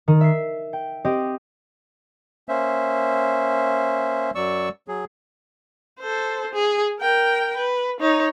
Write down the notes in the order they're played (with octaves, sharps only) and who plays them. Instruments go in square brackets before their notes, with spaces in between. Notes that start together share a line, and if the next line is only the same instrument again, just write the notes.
[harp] D#3
E5 C7
G5
C4 G4 D#5 D#7
[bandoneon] A#3 C#4 C5 E5
F#2 F#3 D5 C#6 E6
F#3 G#4
[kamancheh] A4 C5
G#4
A#4 G5
B4
D#4 C#5